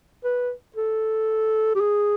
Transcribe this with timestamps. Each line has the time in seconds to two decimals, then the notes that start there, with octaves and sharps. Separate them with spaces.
0.24 B4
0.76 A4
1.75 G4
1.80 G#4